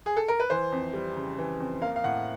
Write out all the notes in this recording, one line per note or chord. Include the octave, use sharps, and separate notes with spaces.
G#4
A4
A#4
B4
E3 C5
F2
G3
C#3
E3
F2
A#3 F5
F5
A2 F#5